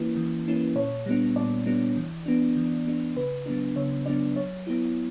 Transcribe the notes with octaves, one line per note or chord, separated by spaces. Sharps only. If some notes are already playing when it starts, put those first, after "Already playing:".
Already playing: E3 A#3 C#4 E4 B4
E3
A#3 C#4 E4
A#2 C#5
G3 B3 D4
A#2 D5
G3 B3 D4
E3
B3 D4
E3
B3 D4
C#3 B4
F#3 B3 D4
C#3 C#5
F#3 B3 D4 D5
F#3 C#5
B3 E4